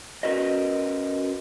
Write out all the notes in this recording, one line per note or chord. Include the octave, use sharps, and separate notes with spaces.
C#4 F#4 A#4 B4 D#5